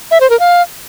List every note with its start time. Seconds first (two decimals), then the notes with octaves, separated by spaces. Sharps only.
0.11 E5
0.21 C5
0.30 A#4
0.40 F5